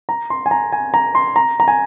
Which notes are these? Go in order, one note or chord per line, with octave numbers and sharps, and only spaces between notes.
A#5
C6
G#5
A#5
G#5
A#5
C6
A#5
A#5
G#5